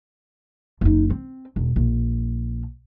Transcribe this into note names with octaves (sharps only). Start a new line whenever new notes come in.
F#1 D#4
C4
E1
A#1